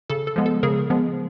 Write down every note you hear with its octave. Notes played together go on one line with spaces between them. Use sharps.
C#3 A4
A4
F3 G#3 B3
A4
C#3 G#4 A#4
F3 G#3 B3